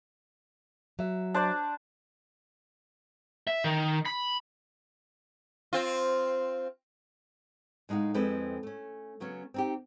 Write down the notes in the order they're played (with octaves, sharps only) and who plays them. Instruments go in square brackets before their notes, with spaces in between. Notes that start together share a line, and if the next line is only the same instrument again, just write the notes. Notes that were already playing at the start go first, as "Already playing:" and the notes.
[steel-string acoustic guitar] F#3 E5
[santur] D4 C5 D5
[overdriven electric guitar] E5
D#3
B5
[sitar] C4 F4
[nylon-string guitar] A2 G#3 D#4 F5 F#5
F2 G#3 C4 E4 A4 B4
A3 C#4
C#3 F#3 B3 C#4
C4 D#4 G4